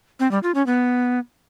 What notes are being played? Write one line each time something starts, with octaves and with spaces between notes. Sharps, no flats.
C4
G3
F4
C#4
B3